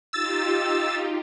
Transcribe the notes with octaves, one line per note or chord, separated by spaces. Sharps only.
D#4 F4 G4 E6 A6